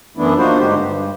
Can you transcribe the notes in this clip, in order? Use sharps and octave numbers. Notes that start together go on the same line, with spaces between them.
F#2 E3 A3 B3 D4 E4
A#3 D4 D#4 F4 F#4 C5
G2 D3 G#3 D#4 G4 C5
G2